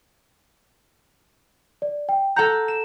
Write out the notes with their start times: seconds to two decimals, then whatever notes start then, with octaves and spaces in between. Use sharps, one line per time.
1.82 D5
2.09 G5
2.36 A4 F#5 A#5 G6
2.68 E7